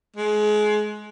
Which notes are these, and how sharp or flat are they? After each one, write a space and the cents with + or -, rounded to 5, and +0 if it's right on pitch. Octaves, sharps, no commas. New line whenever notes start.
G#3 +25